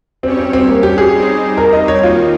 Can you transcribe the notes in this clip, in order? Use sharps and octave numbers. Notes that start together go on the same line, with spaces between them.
G2 G3 C4 C#4 G4 C#5
C4
C4
A#3
G4
G#4
G3 C4 D#4 G4 C5
A#4
D#5
C#5
D#2 D#3 A#3 D#4 F4